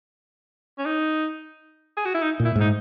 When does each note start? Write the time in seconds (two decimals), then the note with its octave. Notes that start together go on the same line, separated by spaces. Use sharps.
0.78 C#4
0.85 D#4
1.97 G#4
2.05 F#4
2.14 E4
2.22 D#4
2.40 A#2
2.45 E4
2.56 G#2 D#4